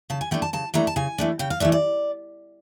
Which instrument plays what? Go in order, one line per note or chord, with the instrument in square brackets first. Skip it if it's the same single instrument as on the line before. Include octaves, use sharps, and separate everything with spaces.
[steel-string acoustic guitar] C#3 A5
G#5
E3 A3 D4 G5
A5
C#3 A5
E3 A3 D4 A#5
A5
C#3 G#5
E3 A3 D4
C#3 G5
F5
E3 A3 D4 E5
D5